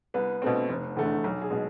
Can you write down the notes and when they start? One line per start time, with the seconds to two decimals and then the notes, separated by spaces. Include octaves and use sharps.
0.14 C2 B3 B4
0.42 B2 A3 C4
0.69 F1
0.97 E2 D3 A3
1.24 B1
1.42 G#4
1.51 B2 G#3